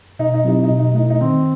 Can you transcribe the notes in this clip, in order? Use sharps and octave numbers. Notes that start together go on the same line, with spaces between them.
B2 D#4
D#4
F#3 C4 D#4 E4 G4
D#4
B2
D#4
A3 D#4 E4
D#4
D#3 C4